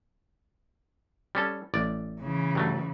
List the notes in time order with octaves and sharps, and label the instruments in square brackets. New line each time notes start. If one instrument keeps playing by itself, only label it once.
[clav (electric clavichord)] G3 C#4 A4
A1 D5
[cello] C#3 E3
[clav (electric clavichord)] G2 F#3 A3